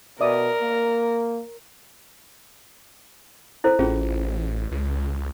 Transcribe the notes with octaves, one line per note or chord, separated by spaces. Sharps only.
B2 A#4 D5 E5 D#6
A#3
E4 A4 C5
A1 C#4 F4 G#4
C#2